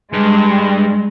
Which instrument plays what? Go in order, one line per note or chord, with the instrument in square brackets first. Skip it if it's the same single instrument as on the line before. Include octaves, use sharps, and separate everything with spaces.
[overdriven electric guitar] G2 [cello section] G#3